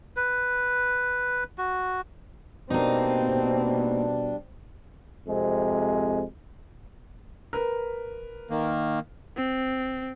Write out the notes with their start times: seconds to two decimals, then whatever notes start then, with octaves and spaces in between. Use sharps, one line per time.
0.16 B4
1.58 F#4
2.70 B2 G3 A#3 C4 D4 D#4
5.28 F2 C3 G#3
7.53 A#4 B4
8.50 D#3 A#3
9.37 C4